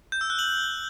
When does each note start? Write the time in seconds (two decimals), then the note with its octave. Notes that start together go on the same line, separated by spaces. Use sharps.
0.12 G6
0.21 E6
0.30 F#6
0.39 F#7